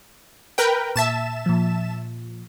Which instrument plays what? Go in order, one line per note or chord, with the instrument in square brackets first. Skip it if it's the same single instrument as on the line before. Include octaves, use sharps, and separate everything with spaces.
[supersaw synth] A#4 B4 G5
[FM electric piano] A#2 [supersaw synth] E5 A5 E7
[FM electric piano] A#2 F3